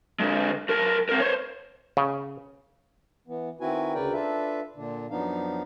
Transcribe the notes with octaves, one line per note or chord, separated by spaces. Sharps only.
D3 G#3
B1 A#4
C4 A#4
C5 C#5
C#3
E3 B3
D#3 C4 E4 F#4 B4 G#5
D2 C#3 A#4 B4 D5 G5
D4 F4 A4 B4 E5
A#2 D3 D4
F#2 F3 B3 D4 D#4 F5